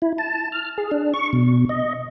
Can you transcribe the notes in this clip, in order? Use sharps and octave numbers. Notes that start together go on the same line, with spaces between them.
E4
A5
F6
G#4
D4
C#6
B2
D#5